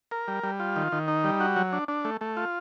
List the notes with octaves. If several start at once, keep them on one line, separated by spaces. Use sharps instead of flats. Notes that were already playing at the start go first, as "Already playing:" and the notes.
A#4
G3
G3
F4
D#3
D#3
D#4
G3
F#4
F#3
D4
D4
A3
A3
F4